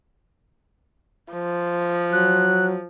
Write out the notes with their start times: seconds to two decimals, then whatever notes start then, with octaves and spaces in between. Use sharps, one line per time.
1.33 F3
2.13 F#3 F#6